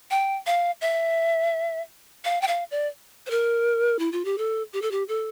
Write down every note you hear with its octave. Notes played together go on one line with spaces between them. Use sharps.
G5
F5
E5
F5
G5
F5
D5
C5
A#4
E4
F4
G4
A4
G4
A4
G4
A4